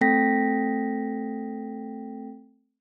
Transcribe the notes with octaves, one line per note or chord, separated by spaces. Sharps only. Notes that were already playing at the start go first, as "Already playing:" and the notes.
A3 C4 A4 G5 A#6 B6